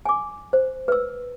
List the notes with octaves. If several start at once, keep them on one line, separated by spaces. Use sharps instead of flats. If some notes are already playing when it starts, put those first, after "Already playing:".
G#5 D6
C5
B4 E6